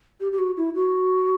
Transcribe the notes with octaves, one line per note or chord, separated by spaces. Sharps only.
G4
G4
F#4
E4
F#4